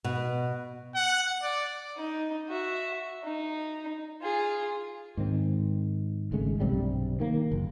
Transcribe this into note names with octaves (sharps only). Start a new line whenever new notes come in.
B2
F#5
D5
D#4
F#4 E5
D#4
F4 G#4
G#2 D#3 C4
G#1 C#3 G#3 A3
B1 G2 C3 G3
D#3 A#3
F#1